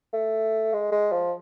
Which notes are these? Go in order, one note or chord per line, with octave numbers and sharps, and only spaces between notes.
A3
G#3
G#3
F3